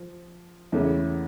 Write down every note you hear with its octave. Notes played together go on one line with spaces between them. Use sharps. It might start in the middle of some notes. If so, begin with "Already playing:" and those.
Already playing: F3
E2 C#3 E3 A3 C#4